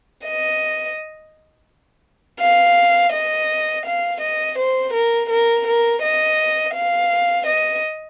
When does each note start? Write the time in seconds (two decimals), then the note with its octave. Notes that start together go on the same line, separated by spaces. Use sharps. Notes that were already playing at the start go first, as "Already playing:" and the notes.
0.25 D#5
2.41 F5
3.13 D#5
3.85 F5
4.22 D#5
4.58 C5
4.94 A#4
5.30 A#4
5.66 A#4
6.02 D#5
6.75 F5
7.46 D#5